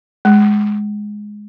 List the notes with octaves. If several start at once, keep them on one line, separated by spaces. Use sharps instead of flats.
G#3